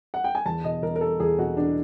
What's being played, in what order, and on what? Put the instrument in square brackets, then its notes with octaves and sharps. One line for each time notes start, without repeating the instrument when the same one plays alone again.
[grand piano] F#5
G5
G#5
E2 A5
B2 D#5
E2 A#4
A#4
G3 A4
E2 G#4
B2 F#4
E2 D4